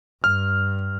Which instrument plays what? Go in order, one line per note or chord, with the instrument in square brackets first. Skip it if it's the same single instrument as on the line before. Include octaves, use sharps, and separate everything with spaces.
[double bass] G2 [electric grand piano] F6